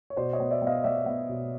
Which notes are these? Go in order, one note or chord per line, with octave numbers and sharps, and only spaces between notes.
C#5
B2 C5 D5
C#5 D#5
B3
D5 E5
B3 D#5 F5
B3 D5 E5
B3
B2